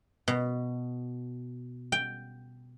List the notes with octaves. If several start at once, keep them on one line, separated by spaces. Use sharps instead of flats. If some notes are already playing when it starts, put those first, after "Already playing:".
B2
G5